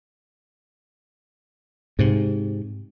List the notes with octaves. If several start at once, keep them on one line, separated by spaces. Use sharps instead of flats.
G#2 C3